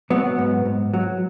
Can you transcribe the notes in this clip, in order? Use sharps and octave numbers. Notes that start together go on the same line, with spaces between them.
F#3 B3
G#2
G#2
F#3